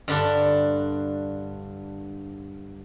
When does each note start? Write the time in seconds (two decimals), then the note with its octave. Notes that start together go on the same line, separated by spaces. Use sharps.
0.08 G2 D3 D4